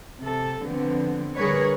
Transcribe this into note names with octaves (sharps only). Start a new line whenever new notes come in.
C3 A4
D3 F3 B3 C4
D3 G3 G#4 A#4 B4 C#5